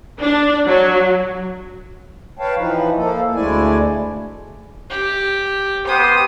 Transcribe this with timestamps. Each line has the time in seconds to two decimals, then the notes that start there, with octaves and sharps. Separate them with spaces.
0.20 D4
0.67 F#3
2.39 B4 C#5 F5 G5 A5
2.56 E3 F3 D#4 B4
2.96 F3 A#3 A4
3.35 D2 G#3 A3 E4 D5 G#5
4.90 G4
5.87 B3 G4 C5 D#6